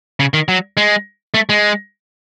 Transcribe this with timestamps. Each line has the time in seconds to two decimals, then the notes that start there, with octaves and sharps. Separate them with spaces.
0.20 C#3
0.34 D#3
0.48 F#3
0.77 G#3
1.34 A3
1.49 G#3